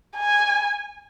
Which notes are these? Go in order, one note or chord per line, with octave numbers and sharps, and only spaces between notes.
G#5